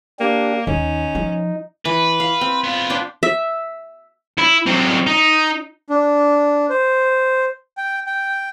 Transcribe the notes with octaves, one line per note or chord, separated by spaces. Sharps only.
A#3 D4 G4
D#2 C#4 D#4
F3
E3 B4
F5
C4
B3 F4
D4 C5 G5
E5
E4
F#3 C4
D#4
D4
C5
G5
G5